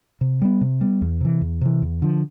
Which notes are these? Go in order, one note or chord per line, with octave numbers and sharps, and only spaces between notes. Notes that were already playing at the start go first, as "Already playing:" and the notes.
C3
G3 B3
C3
G3 B3
E2
C3 E3
E2
C3 E3
E2
D3 F3